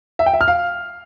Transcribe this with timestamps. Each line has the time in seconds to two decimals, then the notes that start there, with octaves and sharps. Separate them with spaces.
0.19 E5
0.26 G5
0.33 E5
0.41 F6
0.48 F5